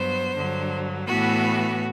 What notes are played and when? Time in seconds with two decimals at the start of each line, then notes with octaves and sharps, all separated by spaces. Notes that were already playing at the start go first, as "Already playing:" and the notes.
Already playing: G2 F#3 B3 C5
0.35 G2 D3 F#3
1.07 A2 E3 B3 F#4